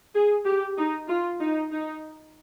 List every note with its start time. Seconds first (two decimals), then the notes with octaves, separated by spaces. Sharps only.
0.15 G#4
0.46 G4
0.78 D#4
1.09 F4
1.41 D#4
1.72 D#4